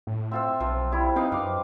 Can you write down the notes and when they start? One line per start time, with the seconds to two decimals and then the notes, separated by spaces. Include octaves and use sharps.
0.07 A2
0.31 C4 F4 E5 E6
0.60 B1 F3
0.92 G3 E4
1.16 C4 D#4 B4 F5 G5
1.32 F#2 F5 D6